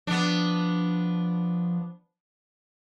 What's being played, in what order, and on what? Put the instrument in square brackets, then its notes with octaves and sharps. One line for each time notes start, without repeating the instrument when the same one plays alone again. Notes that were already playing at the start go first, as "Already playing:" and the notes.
[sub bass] F3 [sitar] B3 D4